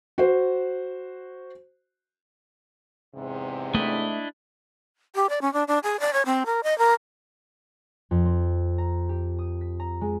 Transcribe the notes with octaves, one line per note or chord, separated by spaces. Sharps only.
F#4 C5
E2 G#2 C3
A3 D4 E4 D#5
G4
D5
C#4
D4
D4
G#4
D5
C#5
C4
A#4
D#5
A#4
F2
C4
A#5
G4
D#6
B6
A#5
G#3